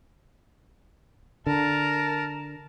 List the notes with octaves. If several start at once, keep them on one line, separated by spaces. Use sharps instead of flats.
D3 A#4 A5